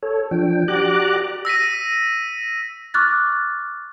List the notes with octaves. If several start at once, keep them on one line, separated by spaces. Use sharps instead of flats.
A4 C#5
F3 D4 G5
F#4 G4 D5 A#5 D6 F#6
E6 A#6 B6 D#7
C#6 D6 F6 F#6 A6